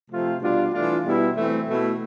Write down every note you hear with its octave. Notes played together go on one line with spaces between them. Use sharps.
C3 F3 A3 C4 F4
B2 G3 D4 F4
E3 A3 D4 F4
B2 G3 B3 E4
E3 A3 C4
B2 A3 E4